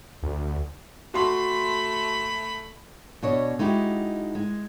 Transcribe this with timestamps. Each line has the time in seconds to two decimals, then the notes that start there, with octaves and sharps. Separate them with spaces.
0.23 D2
1.14 A3 F#4 B5 C6
3.22 B2 D4 C#5 D#5
3.59 G#3 D#4 E4 F#4 G4
4.35 G#3